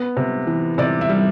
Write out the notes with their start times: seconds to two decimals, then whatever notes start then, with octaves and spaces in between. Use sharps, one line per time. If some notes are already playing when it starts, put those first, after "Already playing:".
Already playing: B3
0.17 C3
0.47 E3
0.78 C3 D5
1.01 E5
1.09 G3